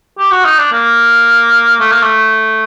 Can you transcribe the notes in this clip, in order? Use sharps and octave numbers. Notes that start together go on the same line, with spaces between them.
G4
F#4
D#4
D4
A#3
A3
A#3
A3